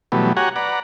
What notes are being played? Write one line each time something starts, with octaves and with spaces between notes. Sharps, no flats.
B2 E3 F#3 G3 A3 B3
F#4 G4 C#5 F#5 G#5 A#5
B4 D5 F#5 A#5